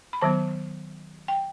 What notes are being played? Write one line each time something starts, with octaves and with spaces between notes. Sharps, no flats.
B5
D#3 F#3 B3 A5
G5